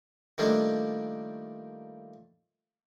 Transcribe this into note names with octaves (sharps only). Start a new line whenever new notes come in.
D#3 F3 G3 A3 A#3 D4